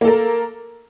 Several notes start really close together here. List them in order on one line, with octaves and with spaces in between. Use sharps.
A#3 A4 A#4